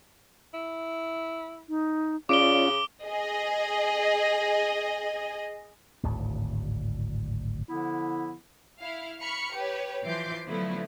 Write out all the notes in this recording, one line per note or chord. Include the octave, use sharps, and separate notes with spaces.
E4
D#4
C#3 C#4 F4 D5 D6 D7 G7
G#4 D#5
D1 G#1 D2
D3 F3 B3 E4
E4 F5
B5 C#6 F6 C#7
G4 B4 C#5
E3 F3 C6 D6 G6
D3 F3 F#3 A3 B3 E4